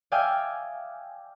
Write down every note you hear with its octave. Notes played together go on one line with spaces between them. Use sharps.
D5 E5 F5 G5 G#5 D#6